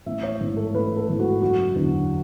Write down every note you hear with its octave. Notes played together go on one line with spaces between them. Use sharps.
A1 E5
C#5
G#2 E3
A4
A1 B4
A4
G#2 E3
F#4
F#1 F#4
E2 D3 F#3